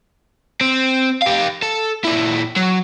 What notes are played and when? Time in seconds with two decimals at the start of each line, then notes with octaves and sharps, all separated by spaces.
0.61 C4
1.22 G4 F5
1.62 A4
2.05 A#2 E4
2.57 F#3